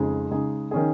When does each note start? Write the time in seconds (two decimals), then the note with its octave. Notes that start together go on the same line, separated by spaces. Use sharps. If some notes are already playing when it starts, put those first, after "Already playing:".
Already playing: F2 C#3 G#3 D#4 G#4
0.31 C#3 G#3 D#4 G#4
0.71 D#3 C#4 G#4